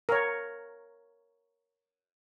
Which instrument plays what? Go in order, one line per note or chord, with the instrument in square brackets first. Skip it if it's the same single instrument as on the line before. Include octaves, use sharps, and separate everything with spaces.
[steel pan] A#4 C#5